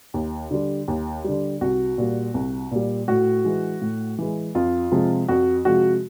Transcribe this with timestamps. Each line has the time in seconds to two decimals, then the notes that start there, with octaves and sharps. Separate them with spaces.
0.14 D#2
0.51 D3 G3
0.88 D#2
1.24 D3 G3
1.61 C2 F#4
1.98 A#2 G3
2.34 C2
2.71 A#2 G3
3.08 A2 F#4
3.45 E3 G#3
3.81 A2
4.18 E3 G#3
4.55 F2 F4
4.92 C3 F3 G#3
5.28 F2 F#4
5.65 C3 F3 G#3 F#4